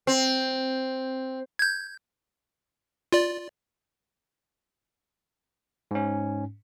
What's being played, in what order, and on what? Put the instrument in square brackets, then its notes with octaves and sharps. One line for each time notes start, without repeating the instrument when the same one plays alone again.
[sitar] C4
[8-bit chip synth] G6 G#6
F4 D5
[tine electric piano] G#2 C#4